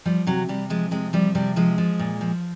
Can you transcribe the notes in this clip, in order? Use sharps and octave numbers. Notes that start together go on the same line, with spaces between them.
F3 G3
C3 F#3
C3 G3
F3 G#3
C3 G#3
F3 G3
C3 G3
F3 G#3
F3
A#2
F3